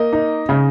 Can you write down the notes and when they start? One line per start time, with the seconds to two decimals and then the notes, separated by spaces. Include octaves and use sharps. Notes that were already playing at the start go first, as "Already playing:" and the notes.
Already playing: A#3 D#5
0.13 D#4
0.49 C#3